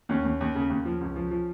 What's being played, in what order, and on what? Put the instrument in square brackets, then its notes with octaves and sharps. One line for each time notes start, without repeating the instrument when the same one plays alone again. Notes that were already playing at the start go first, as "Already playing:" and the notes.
[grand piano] D#2 C#4
D#2
D#2
C#3
D#2
F3
C#2
F3
F3